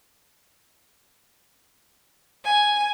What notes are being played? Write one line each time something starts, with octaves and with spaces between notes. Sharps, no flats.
G#5